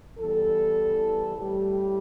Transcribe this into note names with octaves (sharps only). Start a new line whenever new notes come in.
E2 E3 G3 A4
A2 G3 G4